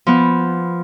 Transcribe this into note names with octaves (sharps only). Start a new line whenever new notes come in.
F3 B3